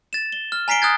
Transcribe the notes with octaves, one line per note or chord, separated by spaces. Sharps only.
A6 E7
G7
F6
G#5 A#5 B6 C7 D7 G7
D#6 F6 F#6 G#6 A6